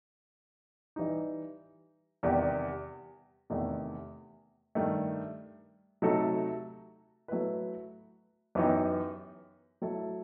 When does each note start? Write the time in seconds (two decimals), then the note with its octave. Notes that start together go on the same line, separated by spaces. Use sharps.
0.96 E3 G3 D#4
2.23 E2 C3 D#3 G3
3.50 E2 C3 D#3 A3 E4
4.75 G2 D#3 A3
6.02 C3 F#3 A3 D#4 A4
7.28 F#3 A3 E4 B4
8.55 F#2 E3 B3 D#4 G4
9.82 F#3 A3 E4 A4